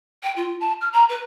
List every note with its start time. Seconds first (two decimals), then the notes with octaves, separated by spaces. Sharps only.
0.23 G5
0.36 F4
0.60 A5
0.81 F6
0.93 A#5
1.09 B4